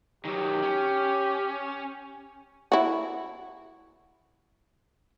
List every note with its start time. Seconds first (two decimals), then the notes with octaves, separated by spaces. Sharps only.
0.25 D#3 F#3 G4
0.62 C#4
2.72 E4 F#4